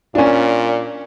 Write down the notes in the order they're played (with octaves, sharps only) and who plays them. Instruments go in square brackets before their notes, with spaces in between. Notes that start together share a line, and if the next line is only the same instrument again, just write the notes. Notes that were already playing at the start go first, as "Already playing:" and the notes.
[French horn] A#2 [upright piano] C#4 D4